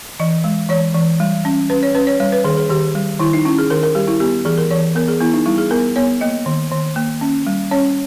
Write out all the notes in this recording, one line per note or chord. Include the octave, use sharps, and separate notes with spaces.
E3 D#5
G#3
E3 C#5
E3
G3
C#4
C#4 B4
C#5
C#4 B4
C#5
G3 C#5
B4
D#3 G#4
G#4
D#3 G4
G3
D#3 E4
D#4
C#4 E4
G#4
D#3 A#4
A#4
G3 G4
E4
B3 G4
E3 G#4
A#4
E3 C#5
B3 A#4
G#4
B3 E4
D#4
G3 E4
G#4
B3 A#4
B3 C#5
A#3 D#5
D#3
D#3
A#3
C#4
G3
C#4 C#5